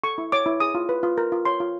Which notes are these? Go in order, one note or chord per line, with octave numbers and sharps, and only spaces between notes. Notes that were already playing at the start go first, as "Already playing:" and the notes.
A4 C#6
E4
C#5 D6
E4
G#4 D#6
F4
B4
F4
A#4
F4
C#5 C6
F4